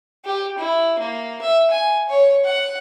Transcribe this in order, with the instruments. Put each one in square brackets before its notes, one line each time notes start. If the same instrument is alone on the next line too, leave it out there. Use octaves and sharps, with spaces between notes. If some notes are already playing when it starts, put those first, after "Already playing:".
[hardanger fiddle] G4
E4
A#3
E5
G#5
C#5
F#5